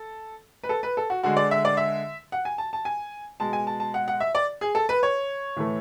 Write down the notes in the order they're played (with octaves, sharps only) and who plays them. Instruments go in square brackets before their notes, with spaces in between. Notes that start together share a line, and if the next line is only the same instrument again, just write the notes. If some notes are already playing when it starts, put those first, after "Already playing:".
Already playing: [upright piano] A4
B4
A4
B4
A4
F#4
D3 G#3 F#4
D5
E5
D5
E5
F#5
G#5
A5
A5
G#5
B2 G#3 A5
G#5
A5
A5
F#5
F#5
E5
D5
G#4
A4
B4
C#5
A2 E3 A3